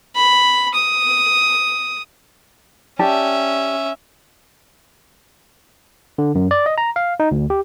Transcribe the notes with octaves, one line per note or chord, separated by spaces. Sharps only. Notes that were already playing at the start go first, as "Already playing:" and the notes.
B5
D#6
C#4 G4 D5 E5 A5
D3
F#2
D5
D#5
A#5
F5
D#4
D2
G4